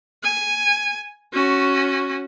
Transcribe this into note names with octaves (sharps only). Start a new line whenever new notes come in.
G#5
C#4 F#4